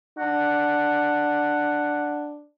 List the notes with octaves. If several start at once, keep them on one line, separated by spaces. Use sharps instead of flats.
D4 F#5